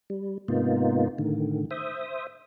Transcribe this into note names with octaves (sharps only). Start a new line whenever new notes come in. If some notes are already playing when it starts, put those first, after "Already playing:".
G3
G#2 C3 A#3 B3 D#4 F4
A2 D3 D#3
C5 E5 D#6